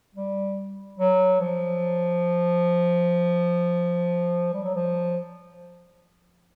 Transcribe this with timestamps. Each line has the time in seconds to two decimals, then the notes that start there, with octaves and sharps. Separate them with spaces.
0.15 G3
0.99 F#3
1.40 F3
4.54 G3
4.64 F#3
4.75 F3